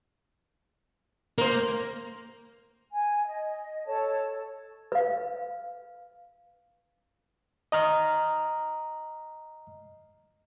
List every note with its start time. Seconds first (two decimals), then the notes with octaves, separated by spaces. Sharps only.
1.38 A#3 A#4 C5
2.92 G#5
3.26 D#5
3.86 A4 C#5 A5
4.92 B4 F5
7.72 D#5 A#5 F6